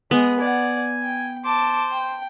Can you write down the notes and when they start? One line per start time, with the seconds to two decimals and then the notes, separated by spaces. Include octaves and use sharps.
0.11 G#3 B3 G#4
0.40 D5 F#5 G#5
1.03 G5
1.44 C5 A5 D6
1.91 G5